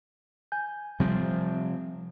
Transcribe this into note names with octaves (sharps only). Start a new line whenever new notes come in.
G#5 G6
C3 F3 G3 C4